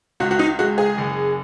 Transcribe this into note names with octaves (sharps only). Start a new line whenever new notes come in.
C#2 F#4
F#4
D#4
G#3 F#4
G#4
F#1